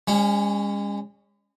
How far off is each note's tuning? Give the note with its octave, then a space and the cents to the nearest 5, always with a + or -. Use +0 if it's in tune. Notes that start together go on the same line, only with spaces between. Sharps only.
G#3 -40 C#4 +5